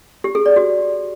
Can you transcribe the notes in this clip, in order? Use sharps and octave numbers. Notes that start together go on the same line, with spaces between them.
G4
G#4
D5
F#4